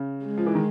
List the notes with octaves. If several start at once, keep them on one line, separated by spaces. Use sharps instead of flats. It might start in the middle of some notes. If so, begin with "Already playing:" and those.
Already playing: C#3
G#3
F3
E3
D#3